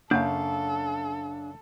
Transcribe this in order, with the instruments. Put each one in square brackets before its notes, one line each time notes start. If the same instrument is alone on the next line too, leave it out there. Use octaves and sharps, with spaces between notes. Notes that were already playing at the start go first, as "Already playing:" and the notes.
[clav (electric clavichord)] F#2 C#3 [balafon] A#3 [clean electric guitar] D4 F5 [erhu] A4